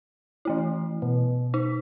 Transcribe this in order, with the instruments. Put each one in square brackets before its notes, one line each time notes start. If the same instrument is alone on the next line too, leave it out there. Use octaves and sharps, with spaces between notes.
[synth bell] E3 A3 E4
[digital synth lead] B2
[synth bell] D#4